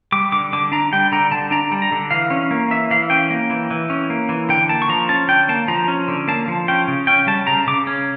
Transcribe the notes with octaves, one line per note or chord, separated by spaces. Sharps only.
G3 D6
D3 D6
D3 D6
D4 A#5
G3 G5
D3 A#5
D3 A5
D4 A#5
G3
A#5
D3
E3 F5
C#4
A#3
E3 E5
E3 F5
C#4 G5
A#3
E3
E3
C#4
A#3
E3
D3 G5
A#3 A5
C#6
F3 A#5
C#4 A5
D3 G5
A#3 A5
F3 A#5
C#4
D3
A#3 A5
F3
C#4 G5
C#3
C#4 G5
G3 A5
C#3 A#5
C#3 D6
C#4